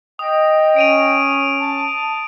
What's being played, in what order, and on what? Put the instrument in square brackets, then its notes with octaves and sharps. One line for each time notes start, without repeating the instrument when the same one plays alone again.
[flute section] D#5 G5 [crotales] D#6
[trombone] C#4 [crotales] D7 D#7 F7
[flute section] A5